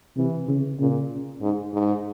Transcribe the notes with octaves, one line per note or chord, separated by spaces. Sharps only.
C3 E3
C#3
A#2 C#3
G#2
G#2